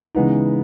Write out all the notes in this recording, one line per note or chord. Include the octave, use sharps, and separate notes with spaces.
C#3 E3 G#3 B3 D#4